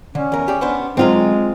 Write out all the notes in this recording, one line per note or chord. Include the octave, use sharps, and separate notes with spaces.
D3 C#4
E2 A#4
G4 G#4 D5
B3 D4 C5
D3 F#3 G#3 C4 F4